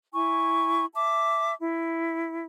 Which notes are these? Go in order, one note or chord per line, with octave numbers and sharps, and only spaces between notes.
E4 G#5 C#6
E5 A5 D6
E4